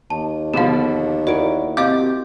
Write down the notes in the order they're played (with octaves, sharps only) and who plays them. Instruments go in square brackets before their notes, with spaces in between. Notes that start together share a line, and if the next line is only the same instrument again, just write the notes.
[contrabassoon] D#2 [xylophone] A5
[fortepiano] B2 D3 F3 [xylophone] G#4 F5
[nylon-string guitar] E4 F#4 A#4 [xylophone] D5 D7
[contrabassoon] C3 [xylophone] D#5 F5 G6 [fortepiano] D6